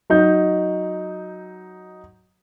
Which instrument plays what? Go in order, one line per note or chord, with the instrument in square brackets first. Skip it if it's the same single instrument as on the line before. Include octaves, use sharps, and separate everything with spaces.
[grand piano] F#3 D#4 G6